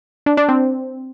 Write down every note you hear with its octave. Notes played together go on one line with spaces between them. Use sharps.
D4
D4
C4